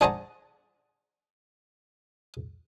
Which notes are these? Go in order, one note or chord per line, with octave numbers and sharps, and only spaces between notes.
D4 G#4 C5 F#5 A5 A#5